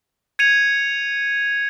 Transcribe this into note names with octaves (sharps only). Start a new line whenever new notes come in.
G#6 C#7 D#7 F7